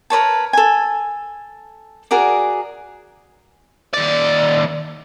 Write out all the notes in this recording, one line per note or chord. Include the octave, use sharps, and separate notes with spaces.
A#4 B4 C#5 A5
A4 G#5
F#4 G#4 A#4 D5
D#2 D5